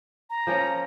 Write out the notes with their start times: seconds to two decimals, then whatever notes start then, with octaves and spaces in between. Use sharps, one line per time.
0.30 A#5
0.47 F3 A#3 C#4